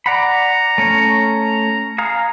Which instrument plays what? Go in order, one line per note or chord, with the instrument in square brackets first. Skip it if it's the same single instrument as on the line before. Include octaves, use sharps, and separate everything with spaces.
[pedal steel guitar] D5 F#5 B5 [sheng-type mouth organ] A#5
[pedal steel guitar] A3 C#4 C#5
G#4 F5 A#5